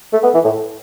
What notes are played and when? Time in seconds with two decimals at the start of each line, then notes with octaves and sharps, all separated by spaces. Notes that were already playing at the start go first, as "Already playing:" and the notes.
0.13 A3
0.23 B3
0.34 E3
0.45 A2